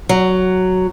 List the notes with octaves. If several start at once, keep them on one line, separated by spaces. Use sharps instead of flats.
F#3